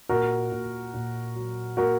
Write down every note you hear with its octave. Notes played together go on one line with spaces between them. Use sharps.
A#2 F#4 A#4
A#2
A#2
F#3
A#3 F#4 A#4